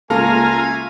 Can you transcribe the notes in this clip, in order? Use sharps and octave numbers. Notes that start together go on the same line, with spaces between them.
C#2 A3 A#3 F4 A4 F5 G#5 A#5